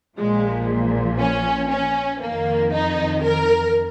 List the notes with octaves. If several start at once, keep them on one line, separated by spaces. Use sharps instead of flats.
A#1 A#2 F3 G#3
C#4
C#4
F2 D#3 A#3
D#4
A#4